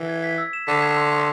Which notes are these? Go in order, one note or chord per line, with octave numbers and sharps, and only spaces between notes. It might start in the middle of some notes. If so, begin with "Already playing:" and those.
Already playing: E3
G#6
B6
E6
E7
D3 B6
G#6
C6
C6